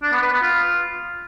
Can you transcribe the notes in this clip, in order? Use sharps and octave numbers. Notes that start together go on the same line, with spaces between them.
D4
B3
B4
B3
F4